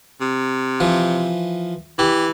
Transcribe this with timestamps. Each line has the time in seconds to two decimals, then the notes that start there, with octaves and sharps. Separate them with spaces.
0.21 C3
0.80 E3 F3
1.99 E3 G4